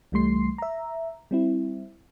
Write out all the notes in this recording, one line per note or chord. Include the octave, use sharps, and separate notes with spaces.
C2 E3 G3 A3 C6 C7
E5 A#5
G3 C4 E4